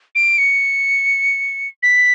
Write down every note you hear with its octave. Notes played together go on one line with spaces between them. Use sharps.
D7
C#7
B6